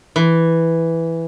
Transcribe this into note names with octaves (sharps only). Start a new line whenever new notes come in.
E3